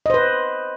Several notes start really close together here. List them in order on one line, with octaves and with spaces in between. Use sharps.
D#5 C5 B4